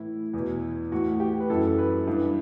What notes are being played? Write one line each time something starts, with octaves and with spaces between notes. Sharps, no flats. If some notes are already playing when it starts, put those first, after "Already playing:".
Already playing: A2 E3 E4
E2 B2
A2 E3 F#4
G4
B4
F#2 E3 A4
B4
G2 E3